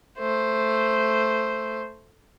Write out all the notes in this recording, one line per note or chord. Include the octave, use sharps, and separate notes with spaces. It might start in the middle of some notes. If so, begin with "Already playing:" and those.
A3 C5